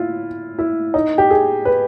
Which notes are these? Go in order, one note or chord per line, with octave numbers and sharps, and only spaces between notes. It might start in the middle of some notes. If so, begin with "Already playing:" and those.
Already playing: E4 F4
E4
D#4
G4
G#4
B4